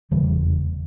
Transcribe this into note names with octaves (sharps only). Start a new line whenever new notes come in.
F1 E2 C#3 E3 G3
E3 G3